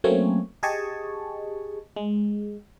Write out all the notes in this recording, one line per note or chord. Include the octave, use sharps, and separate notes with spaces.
F#3 A3 A#3 C4 C#4 C#5
G4 G#4 D#5 G#5 A5 C#6
G#3